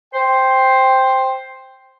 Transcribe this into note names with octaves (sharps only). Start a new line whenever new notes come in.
C5 G5